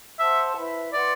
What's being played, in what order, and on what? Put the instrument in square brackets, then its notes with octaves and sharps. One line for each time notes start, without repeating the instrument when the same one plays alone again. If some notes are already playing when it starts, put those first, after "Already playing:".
[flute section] C5 F#5 A5 C6 [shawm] E5
[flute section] E4 B4 E5 B5
[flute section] B4 F#5 C6 [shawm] D5